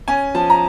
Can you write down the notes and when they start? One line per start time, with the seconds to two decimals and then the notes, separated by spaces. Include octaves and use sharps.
0.08 C#4 G#5
0.35 F3 A5
0.50 A#5